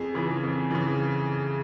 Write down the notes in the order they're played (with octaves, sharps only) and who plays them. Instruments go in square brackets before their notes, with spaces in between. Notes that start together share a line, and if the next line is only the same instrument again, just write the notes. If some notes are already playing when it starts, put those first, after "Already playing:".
Already playing: [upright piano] F2 G#4
C#3 E3
F2
C#3 E3